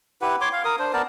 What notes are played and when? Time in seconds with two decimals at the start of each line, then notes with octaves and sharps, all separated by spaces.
0.21 E4 G4 B4 F#5
0.41 C#5 C6 D6
0.53 F5
0.65 A#4 D#6
0.79 D4 C5
0.93 B3 A#4 D5 A5